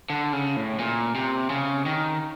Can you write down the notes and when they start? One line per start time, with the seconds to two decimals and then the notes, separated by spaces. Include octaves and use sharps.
0.10 D3
0.33 C#3
0.57 A2
0.79 A#2
1.15 C3
1.50 C#3
1.86 D#3